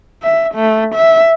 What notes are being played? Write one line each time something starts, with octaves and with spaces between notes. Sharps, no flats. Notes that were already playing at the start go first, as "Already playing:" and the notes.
E5
A3
E5